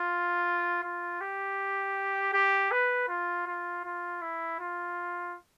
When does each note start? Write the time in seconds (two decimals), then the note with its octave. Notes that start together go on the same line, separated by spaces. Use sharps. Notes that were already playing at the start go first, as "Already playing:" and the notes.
Already playing: F4
0.83 F4
1.21 G4
2.33 G4
2.71 B4
3.08 F4
3.47 F4
3.85 F4
4.22 E4
4.60 F4